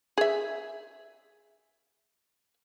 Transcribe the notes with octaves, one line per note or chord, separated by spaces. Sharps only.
G#4 E5